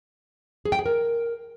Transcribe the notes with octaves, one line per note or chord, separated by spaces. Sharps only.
G#4
G5
G#4
A#4